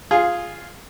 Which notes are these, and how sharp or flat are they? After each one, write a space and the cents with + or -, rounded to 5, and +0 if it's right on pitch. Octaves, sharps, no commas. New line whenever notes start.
F4 +0 G#4 +0